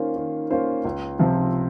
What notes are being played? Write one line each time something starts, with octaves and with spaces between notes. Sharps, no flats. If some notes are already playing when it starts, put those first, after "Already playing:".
Already playing: D#3 A#3 C#4 F4 C5
D#3
A#3 C#4 F4 C5
C#2
C3 F3 C4